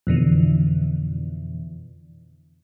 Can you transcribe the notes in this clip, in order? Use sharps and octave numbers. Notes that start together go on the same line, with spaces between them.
F2 B2 D3 E3